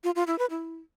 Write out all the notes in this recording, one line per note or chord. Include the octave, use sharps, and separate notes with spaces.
F4
F4
E4
B4
E4